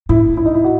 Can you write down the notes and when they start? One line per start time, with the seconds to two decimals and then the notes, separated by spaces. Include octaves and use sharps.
0.09 A2 E4
0.37 E4
0.46 D#4
0.54 E4
0.64 F#4